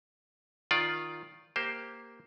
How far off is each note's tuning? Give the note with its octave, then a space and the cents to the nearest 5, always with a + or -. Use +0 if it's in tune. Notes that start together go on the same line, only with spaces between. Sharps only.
D#3 +0 F4 +0 D5 +0
A#3 +0 G4 +0 C5 +5